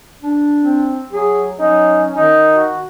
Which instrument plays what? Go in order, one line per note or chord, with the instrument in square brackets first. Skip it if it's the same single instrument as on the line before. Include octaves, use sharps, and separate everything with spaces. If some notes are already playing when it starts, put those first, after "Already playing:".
[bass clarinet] D4
[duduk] C4
[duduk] F#3 [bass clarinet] G#4
[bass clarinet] F#3 [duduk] C#4 [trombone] D#4
[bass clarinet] D#3 [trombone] D#4
[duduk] F#4